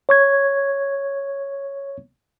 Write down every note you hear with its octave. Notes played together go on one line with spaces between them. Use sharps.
C#5 C#6 G#6